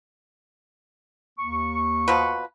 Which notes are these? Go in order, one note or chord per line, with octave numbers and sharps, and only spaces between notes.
D#2 A#3 C#6
B2 F3 B4